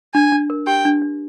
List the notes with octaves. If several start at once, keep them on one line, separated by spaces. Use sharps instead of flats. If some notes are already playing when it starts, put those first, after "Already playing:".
D4 G#5
D4
A#4
G4 G5
D4
D4